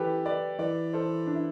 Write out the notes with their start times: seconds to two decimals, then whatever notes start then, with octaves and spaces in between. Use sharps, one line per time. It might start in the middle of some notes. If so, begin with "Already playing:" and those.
Already playing: E3 G4 A4 B4
0.25 B4 D5
0.59 E3 B4 D5
0.93 A4 C5
1.27 D4
1.35 E4